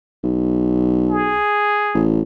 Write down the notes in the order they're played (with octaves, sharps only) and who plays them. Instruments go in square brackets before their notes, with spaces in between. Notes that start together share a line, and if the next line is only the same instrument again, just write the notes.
[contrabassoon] B1
[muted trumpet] G#4
[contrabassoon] A1